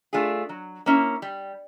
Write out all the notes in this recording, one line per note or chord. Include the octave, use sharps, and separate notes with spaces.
A3 D4 F4 G#4
F#3
A#3 C#4 E4
G3